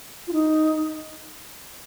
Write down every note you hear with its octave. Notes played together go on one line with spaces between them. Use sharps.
F4
D#4